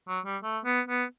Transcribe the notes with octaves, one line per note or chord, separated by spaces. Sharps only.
F#3
G3
A3
B3
B3